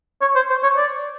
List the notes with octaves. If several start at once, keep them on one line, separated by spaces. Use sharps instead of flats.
C#5
C5
C5
C#5
D5